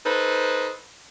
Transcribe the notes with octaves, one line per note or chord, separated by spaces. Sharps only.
D#4 A4 B4 C5